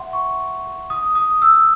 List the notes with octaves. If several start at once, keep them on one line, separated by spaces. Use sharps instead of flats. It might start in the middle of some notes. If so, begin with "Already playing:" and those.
Already playing: E5 F#5 C6
C#6
D#6
D#6
E6